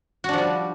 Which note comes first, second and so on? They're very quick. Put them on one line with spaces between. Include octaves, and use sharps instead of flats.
F#4 D4 F3 G3